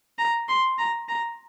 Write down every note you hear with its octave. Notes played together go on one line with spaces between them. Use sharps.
A#5
C6
A#5
A#5